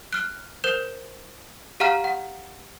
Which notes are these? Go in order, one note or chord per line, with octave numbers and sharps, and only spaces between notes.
F6 F#6
A#4 C5 G6 E7
G4 F5 F#5 A#5 F6
F#5